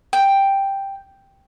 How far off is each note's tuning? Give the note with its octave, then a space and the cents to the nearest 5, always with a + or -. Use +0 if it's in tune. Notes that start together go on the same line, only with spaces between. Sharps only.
G5 +5